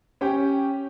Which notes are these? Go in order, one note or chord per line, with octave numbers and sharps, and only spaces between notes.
C#4 G4 G5